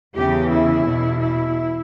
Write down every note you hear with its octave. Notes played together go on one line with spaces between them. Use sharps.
E2 C#3 E3 G4
E4
E2 B2
E4